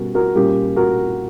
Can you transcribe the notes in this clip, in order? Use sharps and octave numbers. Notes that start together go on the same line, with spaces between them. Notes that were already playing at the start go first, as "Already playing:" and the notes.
Already playing: B2 G3 C#4 F#4 A#4
F#4 A#4
A#2 G3 A#3 C#4 G4
F#4 A#4